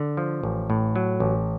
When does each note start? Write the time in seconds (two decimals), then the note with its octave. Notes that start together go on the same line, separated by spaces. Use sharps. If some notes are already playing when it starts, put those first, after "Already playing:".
Already playing: D3
0.17 F3
0.43 A1
0.70 A2
0.96 F#3
1.20 A1